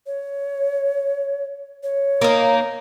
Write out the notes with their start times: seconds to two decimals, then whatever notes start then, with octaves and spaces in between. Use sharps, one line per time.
0.07 C#5
1.83 C#5
2.21 A#3 D#4